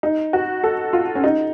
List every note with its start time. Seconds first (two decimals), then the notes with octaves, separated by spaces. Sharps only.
0.03 D#4
0.33 F#4
0.63 A4
0.93 F4
1.15 C#4
1.24 D#4